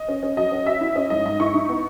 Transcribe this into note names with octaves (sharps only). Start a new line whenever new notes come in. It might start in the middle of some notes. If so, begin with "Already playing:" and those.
Already playing: D#5
C#4
C#4
F#3 D#5
C#4
F#3 E5
E4
C#4 D#5
G#2 D#5
G#2 D#5
E4 C#6
D#4
B3